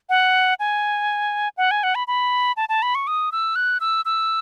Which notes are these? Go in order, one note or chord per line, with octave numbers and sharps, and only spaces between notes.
F#5
G#5
F#5
G#5
F#5
B5
B5
A5
A5
B5
C#6
D#6
E6
F#6
E6
E6